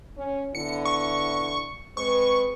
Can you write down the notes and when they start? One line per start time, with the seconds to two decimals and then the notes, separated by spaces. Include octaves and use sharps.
0.18 C#4
0.55 D3 B3 E4 C#7
0.85 C#6
1.97 G#3 C4 B4 C#6